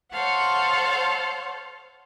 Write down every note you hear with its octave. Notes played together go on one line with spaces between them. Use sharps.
A4 C5 C#5 F5 F#5